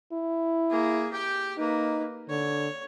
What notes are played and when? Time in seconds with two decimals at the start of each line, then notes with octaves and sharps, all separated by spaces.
0.13 E4
0.70 A#3 G#4
1.12 G4 G5
1.58 A#3 D#4 B4
2.30 D3 C#5